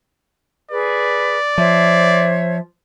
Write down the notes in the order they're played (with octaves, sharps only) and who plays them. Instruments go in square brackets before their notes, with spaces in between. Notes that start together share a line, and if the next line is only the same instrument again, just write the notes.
[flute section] G#4 B4 [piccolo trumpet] D5
[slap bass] F3 [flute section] C5 C#5 E5